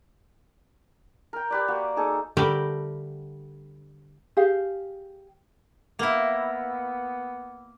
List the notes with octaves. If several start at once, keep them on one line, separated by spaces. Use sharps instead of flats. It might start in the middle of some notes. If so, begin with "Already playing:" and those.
A#4 G5
G4 B4 D5
A#3 F#4
A#3 D#4 G#4 A4
D3 G3 A3 G4 A#4 B4
G4 G#4 F5
A#3 B3 E4